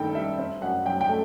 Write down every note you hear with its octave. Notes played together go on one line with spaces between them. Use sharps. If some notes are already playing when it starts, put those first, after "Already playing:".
Already playing: G2 D#3 A4 G5
G3 E5
C4 E5
F#2 F#5
F#3 G5
G5
A3